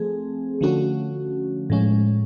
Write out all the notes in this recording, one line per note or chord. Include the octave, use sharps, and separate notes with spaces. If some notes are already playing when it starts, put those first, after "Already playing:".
Already playing: F3 A3 C4 G#4
D3 F3 A3 C#4 F#4
A2 F3 G#3 C#4